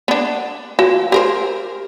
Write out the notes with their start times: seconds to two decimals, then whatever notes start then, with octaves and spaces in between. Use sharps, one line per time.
0.08 B3 D4
0.79 F3 F#4
1.12 G4 A#4 C5